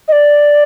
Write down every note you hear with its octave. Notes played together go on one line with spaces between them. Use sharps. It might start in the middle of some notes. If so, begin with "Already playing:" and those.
D#5
D5